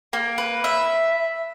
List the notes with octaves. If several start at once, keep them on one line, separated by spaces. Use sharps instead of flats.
A#3
B4
E5